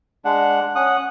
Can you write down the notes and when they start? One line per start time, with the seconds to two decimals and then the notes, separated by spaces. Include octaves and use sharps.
0.25 G#3 D4 F#5
0.76 C#4 F#5 D#6 F#6